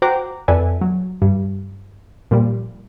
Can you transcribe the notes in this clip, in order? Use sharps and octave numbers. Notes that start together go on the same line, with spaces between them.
F#4 C5 F#5 G5 A#5 D6
F2 A4 B4 D5 E5 G#5
F#3
G2
A#2 F3 G3